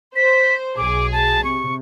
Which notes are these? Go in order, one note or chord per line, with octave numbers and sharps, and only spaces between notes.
C5 B6
B1 G#4 D6
A5
C3 C#6